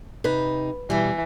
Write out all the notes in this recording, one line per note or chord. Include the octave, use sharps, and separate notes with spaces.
C3 D#4 B4
B2 E3 G3